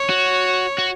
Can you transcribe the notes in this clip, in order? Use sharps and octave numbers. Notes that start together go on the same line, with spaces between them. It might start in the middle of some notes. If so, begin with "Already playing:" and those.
Already playing: C#5
F#4
F#4